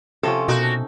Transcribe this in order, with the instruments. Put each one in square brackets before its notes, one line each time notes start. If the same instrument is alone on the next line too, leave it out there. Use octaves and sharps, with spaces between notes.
[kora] C3 F3 C#4 [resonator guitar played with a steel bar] A4
[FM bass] B2 [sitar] A#3 F#4 [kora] D#4